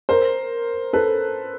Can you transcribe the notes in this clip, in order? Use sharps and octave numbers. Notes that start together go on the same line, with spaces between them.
A#4 C5
A4 B4